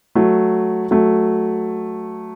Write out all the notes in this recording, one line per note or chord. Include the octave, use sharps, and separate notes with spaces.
F#3 A3
F#3 A3